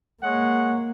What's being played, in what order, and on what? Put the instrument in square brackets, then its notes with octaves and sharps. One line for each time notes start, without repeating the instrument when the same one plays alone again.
[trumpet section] G#3 C#5 F#5 [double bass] A#3